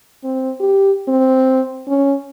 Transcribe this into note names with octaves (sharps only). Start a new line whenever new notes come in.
C4
G4
C4
C#4